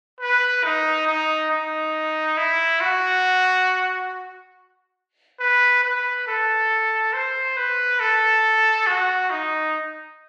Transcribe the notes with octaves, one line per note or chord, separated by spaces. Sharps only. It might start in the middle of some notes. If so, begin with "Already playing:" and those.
B4
D#4
D#4
D#4
E4
F#4
B4
B4
A4
C5
B4
A4
F#4
D#4